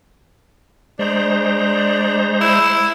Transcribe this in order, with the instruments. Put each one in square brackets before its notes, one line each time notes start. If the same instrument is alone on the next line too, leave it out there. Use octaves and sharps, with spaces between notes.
[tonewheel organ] G#3 C5 A#5 [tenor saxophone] D4
[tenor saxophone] E4